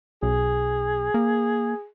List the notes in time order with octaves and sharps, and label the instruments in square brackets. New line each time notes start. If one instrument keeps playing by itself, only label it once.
[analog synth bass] B1 [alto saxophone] G#4
[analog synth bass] A#3